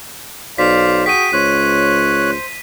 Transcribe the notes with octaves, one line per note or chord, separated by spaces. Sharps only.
B1 C5 D5 F5 B6
F#4 G#4 G5 B6 D#7
C#2 C5 C#5 F#6